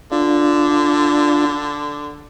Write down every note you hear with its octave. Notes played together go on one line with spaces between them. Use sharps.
D3 D4 F4